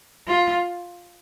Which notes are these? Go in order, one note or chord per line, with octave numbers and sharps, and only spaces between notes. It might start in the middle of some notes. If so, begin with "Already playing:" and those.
F4